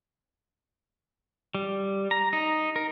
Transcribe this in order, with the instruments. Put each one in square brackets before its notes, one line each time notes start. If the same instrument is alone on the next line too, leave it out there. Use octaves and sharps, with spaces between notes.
[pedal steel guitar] G3
A#5
D#4
A#4